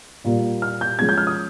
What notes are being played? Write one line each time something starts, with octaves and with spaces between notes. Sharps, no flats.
A#2 G3 A#3
F6
G6
F3 G#3 C#4 G#6
G6
F6
D#6